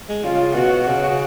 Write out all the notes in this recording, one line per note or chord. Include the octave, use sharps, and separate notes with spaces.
G#3
C#3 F4
B2 F#4
C#3 F#4